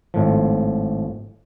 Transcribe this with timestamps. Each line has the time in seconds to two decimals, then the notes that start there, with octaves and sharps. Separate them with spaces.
0.14 G#1 A2 F3